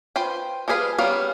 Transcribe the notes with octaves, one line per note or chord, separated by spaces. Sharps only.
F4 B4 C5 G5
F3 G3 G#4 B4 F5
G3 B3 C#4 A#4 F5